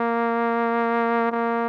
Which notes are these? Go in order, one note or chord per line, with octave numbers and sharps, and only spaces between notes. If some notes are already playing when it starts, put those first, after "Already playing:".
Already playing: A#3
A#3